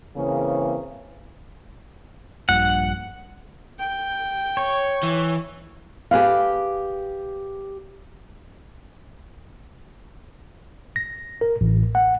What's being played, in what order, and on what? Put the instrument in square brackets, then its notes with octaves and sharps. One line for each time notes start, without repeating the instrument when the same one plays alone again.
[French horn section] C#3 E3 A#3 C4
[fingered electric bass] A#1 G2 A#2 [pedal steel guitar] F#5
[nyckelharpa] G5
[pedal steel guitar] C#5
[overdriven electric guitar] E3
[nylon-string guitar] G4 G#4 B4 F5
[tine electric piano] A#6
A#4
A1
F#5